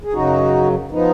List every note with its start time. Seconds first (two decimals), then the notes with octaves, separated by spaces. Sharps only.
0.04 G#4
0.13 F#2 C#3 F#3 D#4 F#4
0.91 F3 B3 D#4